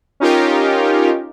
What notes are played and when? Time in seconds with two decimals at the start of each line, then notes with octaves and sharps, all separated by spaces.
0.20 C#4 D#4 F4 G4 A#4